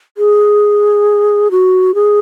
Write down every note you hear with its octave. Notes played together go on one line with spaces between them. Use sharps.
G#4
F#4
G#4